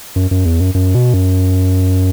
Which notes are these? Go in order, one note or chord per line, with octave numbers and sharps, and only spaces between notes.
F#2
F#2
E2
F#2
F#2
B2
F#2